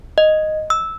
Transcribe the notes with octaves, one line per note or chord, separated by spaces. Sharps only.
D#5
E6